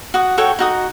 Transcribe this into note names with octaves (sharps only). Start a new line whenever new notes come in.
F#4 D#6
F#4 A4 C#5 G5
D#4 F#4 D#6